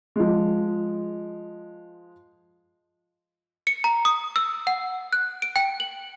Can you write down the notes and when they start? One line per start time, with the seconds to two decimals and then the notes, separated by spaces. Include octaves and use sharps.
0.16 F3 G#3
3.67 C#7
3.84 A#5
4.05 D#6
4.36 E6
4.67 F#5
5.13 F#6
5.42 D7
5.56 G5
5.80 F#7